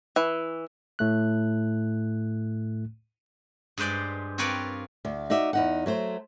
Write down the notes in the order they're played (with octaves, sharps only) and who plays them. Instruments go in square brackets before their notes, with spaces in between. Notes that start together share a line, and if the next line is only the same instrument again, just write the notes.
[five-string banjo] E3
[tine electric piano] A2 A3 F#6
[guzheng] G2 G#3 B4 C5 D5
C4 F4 A#4 B4 C#5 D5
[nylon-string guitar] D2
D#4 F#4 D5 E5
E2 D#4 F#5
F#3 A3 C5